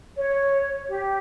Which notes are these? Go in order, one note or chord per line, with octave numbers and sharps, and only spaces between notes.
C#5
G4